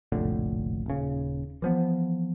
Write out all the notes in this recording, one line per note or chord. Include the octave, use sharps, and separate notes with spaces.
F1 A#1 A2 D3
D#1 C#3
E3 F3 B3